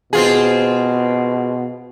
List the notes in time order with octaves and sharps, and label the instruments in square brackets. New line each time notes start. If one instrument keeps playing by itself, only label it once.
[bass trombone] B2 [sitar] C4 F4 G#4